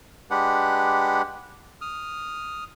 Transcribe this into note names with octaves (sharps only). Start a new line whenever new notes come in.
G#3 D4 G4 B4 F#5
D#6 F6